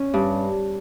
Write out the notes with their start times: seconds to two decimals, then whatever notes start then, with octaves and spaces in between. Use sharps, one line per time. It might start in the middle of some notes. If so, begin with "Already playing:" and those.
Already playing: C#4
0.14 G2